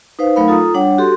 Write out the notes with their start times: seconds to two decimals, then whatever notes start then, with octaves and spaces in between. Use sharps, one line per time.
0.19 D#4 B4 C5 F5
0.36 F#3 A3 D#4 A#4 F5 B5
0.48 F4 A4 A#5 D#6
0.74 G3 D4 C#5 F#5
0.98 F#4 G4 A4 C6